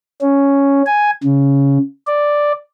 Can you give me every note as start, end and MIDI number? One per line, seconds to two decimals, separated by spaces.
0.21 0.82 61
0.86 1.11 80
1.24 1.78 49
2.07 2.52 74